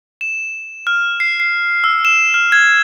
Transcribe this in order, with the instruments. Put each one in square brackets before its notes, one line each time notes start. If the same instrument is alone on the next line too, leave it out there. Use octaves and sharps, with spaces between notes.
[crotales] E7
F6
C7
C7
E6
E7
F6
G#6